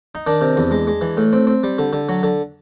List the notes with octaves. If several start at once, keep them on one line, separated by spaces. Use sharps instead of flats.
D#4
D#3 D4
C3
E2
G#3
G#3
E3
A2
C4
C4
G3
D3
D3
F#3
D3